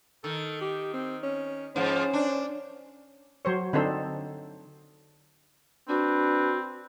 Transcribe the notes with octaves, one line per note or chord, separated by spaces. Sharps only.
D#3 A4
G4
C4
C#4
G#2 F3 C#4 C5
D4
F#3 C5 C#5
D3 C4 D4 D#4 A4 C5
C4 D4 F#4 B4